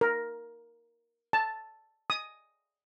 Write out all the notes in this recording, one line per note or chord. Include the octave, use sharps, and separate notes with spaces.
A#4
A5
D#6